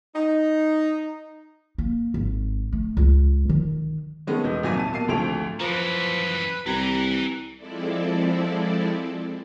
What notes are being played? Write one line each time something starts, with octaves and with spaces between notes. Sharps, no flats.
D#4
A#3
G#1
A3
C#2 F4
D#3
D#3 G#3 A3 B3 C#4
E1 B4 D#5
G#1 A#2 F#3 E5 G#5
D#1 A5 D#7
B2 A#3 A5 C7 D#7
G#1 D2 F3 A3 D7 F7
F#2 E3 F3 B4
C2 G4 B4 G#5 A#5
F3 G#3 C4 E4 A4 D5